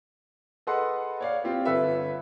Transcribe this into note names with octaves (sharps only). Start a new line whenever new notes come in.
G#4 A4 B4 D#5 F#5 C6
C#5 D5 F5
C4 F4 G4
G1 A4 B4 E5